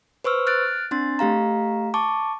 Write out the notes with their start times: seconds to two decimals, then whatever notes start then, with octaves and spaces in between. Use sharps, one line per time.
0.24 B4 C5 C#6 E6 F6
0.47 F6 F#6 A6 D7
0.91 C4 D4 C6 A6
1.19 A3 G4 F5 A#5
1.94 A5 C#6 D6